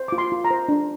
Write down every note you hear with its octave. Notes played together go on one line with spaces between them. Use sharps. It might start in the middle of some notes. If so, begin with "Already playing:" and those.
Already playing: C5
F4 D6
C6
F4
A#5
C5
D4